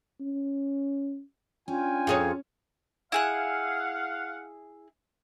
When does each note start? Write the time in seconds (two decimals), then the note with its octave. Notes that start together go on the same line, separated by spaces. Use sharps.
0.20 C#4
1.68 C#4 D4 F4 G5 G#5
2.07 F2 G#4 C#5
3.12 E4 G#4 F5 F#5 F#6